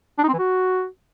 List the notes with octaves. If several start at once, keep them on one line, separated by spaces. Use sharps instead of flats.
D4
D#4
C4
E3
F#4